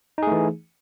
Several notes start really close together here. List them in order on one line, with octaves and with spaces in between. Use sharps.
D#4 G#4 A3 E3